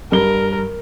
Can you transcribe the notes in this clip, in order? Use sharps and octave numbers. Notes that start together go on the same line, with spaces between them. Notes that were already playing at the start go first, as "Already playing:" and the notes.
G2 A#4 G7